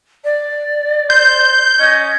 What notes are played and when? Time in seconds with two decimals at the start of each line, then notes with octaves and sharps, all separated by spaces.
0.24 D5
1.10 C5 G6
1.79 C#4 D#5